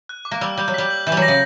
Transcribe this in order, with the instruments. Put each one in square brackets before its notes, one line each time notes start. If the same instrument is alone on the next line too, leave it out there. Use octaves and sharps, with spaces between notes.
[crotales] F#6
D6
[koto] A#3
[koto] G3 [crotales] E6
[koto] G3 [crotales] G6
[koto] F#3
[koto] G3 [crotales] B6
[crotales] F#7
[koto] E3 [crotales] G6
[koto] G3
F#3
[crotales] A#6
[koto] C#3